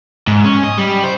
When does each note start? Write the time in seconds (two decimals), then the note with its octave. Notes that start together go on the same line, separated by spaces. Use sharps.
0.28 G#2
0.45 C#4
0.64 D#5
0.78 G3
1.04 C5